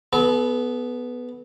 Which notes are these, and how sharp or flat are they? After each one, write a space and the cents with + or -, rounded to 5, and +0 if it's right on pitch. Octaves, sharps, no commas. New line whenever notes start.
B3 +0 A4 -40